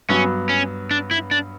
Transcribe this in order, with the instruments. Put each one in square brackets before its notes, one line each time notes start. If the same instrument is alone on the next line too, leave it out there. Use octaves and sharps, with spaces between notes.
[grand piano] G2 F#3 B3 [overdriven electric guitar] C#4
[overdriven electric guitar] C#4
D4
E4
D4